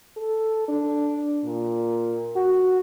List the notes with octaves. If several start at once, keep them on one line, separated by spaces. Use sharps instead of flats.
A4
D4
A#2
F#4